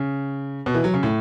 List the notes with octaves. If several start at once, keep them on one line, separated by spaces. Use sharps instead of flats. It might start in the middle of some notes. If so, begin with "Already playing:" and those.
Already playing: C#3
B2
E3
F#3
C#3
A2